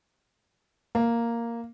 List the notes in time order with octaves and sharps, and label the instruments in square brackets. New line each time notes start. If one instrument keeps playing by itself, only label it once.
[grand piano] A#3